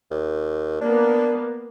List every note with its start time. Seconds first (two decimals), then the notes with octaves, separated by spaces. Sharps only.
0.11 D#2
0.81 A#3 B3 D4